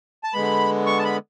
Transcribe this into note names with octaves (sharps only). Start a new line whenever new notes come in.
A5
D3 G#3 B3 B5
C#6
A5
B5